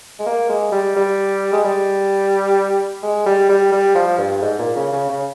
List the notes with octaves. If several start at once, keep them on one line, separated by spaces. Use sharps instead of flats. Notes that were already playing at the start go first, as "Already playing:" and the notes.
G#3
A#3
G#3
G3
G3
G#3
G3
G#3
G3
G3
G3
F3
G2
G#2
A#2
C#3
C#3
C#3